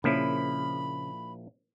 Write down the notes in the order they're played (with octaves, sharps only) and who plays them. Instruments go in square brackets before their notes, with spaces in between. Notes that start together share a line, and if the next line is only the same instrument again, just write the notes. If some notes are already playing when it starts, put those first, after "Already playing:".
[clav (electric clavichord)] A#1 F3 E4 [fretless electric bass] C#3 A#3 C#4 [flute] B5